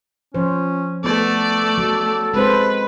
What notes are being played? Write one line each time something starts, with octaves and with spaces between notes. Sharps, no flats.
F3 C#4 C5
A3 B3 A4 D5
F#3
G#3 C4 B4 C5